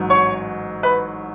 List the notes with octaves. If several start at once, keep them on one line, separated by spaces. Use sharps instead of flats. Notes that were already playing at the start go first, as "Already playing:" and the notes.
Already playing: A1 G#2 F#3
C#5 C#6
B4 B5